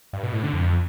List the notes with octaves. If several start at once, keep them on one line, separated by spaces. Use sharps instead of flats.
G2
B2
A2
D3
F2